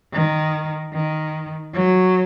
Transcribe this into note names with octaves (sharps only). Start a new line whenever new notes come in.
D#3
D#3
F#3